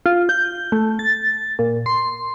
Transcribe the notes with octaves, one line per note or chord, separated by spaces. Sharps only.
F4
G6
A3
A6
A#2
C6